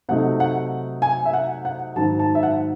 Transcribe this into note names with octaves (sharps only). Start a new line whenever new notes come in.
C3 F#3 A3 D#4 F#5
F#5
G#5
E5
F#5
F#5
G#2 D#3 F#3 A5
A5
E5
F#5